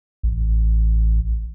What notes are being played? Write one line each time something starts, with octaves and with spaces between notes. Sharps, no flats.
A1